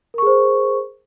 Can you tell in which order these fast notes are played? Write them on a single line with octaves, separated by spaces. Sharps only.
A#4 C#6 G#4 C5